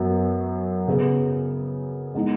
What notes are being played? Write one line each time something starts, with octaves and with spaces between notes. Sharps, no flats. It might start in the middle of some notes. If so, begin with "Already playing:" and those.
Already playing: F#2 F#3 B3 F#4
C#3 B3 G#4 B4
G#3 B3 D#4